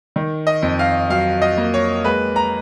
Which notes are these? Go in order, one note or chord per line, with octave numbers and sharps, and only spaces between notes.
D#3
D#5
F2
F5
F#3 F5
D#5
A#3
C#5
G#3 B4
A#5